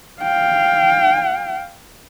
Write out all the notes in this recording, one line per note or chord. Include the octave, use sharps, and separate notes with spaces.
F5 G5